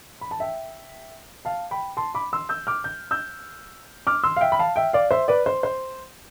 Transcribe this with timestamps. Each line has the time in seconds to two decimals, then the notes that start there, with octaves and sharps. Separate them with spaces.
0.21 B5
0.31 A5
0.40 E5 G5
1.45 F5 A5
1.71 G5 B5
1.97 A5 C6
2.15 B5 D6
2.33 C6 E6
2.49 E6 G6
2.67 D6 F6
2.84 G6
3.11 E6 G6
4.07 D6 F6
4.23 C6 E6
4.36 F5
4.41 E5 G5
4.52 B5
4.59 F5 A5
4.76 E5 G5
4.93 D5 F5
5.11 C5 E5
5.28 B4 D5
5.46 C5
5.63 C5